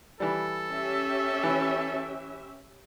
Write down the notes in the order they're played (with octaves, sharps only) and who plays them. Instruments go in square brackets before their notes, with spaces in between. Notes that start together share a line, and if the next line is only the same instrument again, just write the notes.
[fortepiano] E3 G3 [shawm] A4
[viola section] C#4 G4 E5
[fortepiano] E3